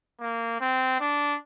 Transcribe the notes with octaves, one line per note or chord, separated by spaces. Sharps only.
A#3
C4
D4